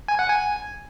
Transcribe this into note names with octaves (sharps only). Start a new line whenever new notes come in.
G#5
F#5
G#5